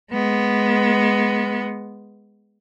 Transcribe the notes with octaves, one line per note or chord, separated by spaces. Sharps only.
G#3 B3